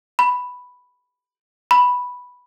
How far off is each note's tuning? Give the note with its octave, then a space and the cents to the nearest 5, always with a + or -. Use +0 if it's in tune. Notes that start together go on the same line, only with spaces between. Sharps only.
B5 +5
B5 +0